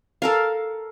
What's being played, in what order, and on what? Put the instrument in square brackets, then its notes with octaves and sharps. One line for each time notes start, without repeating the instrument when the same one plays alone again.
[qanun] A4 A#4 F5